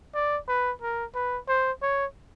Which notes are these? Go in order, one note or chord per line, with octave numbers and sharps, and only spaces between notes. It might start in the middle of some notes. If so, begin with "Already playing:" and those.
D5
B4
A#4
B4
C5
C#5